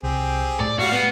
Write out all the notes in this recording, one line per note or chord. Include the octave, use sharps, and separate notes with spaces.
C2 C4 G4 G#4
A2 D5
A2 G3 F#4 F5
B3